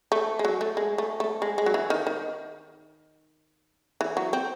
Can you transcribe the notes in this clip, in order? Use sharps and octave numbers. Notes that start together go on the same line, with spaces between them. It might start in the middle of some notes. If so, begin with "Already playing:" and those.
A3
G#3
F#3
A3
G#3
A3
A3
G#3
G#3
F#3
E3
D#3
D#3
E3
F#3
C4